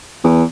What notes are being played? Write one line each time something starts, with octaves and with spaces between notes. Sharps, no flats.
E2